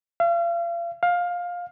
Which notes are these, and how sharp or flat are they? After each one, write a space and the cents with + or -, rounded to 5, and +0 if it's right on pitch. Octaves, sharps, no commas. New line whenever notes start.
F5 -40
F5 +15